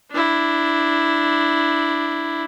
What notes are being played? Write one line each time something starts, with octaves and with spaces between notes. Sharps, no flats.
D4 E4